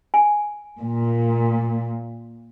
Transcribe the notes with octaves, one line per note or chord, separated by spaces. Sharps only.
G#5
A#2